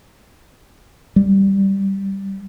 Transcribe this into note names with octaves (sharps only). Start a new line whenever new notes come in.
G3